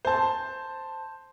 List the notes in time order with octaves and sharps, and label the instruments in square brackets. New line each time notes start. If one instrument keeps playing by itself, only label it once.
[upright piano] C5 A5